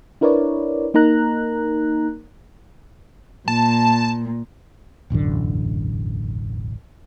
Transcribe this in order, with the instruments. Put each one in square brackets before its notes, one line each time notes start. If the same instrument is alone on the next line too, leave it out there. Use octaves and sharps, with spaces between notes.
[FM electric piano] D4 E4 A#4 B4 C#5 D5
A#3 D#4 A#4 A#5 F#6
[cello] A#2 [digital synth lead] A5
[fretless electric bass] E1 A1 F#2 D3